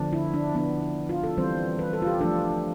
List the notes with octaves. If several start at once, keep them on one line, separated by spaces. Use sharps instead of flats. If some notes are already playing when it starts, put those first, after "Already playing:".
Already playing: D3 F3 B3 D4
E4
D4
F3 B3 D4
F4
A4
E3 G3 C4 C5
B4
A4
F4
G4
F3 A3 D4 A4